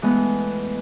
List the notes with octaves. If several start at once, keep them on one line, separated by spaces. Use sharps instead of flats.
E3 G#3 A3 B3